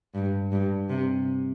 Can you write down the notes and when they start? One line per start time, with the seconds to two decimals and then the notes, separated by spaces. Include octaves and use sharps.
0.15 G2
0.52 G2
0.89 C3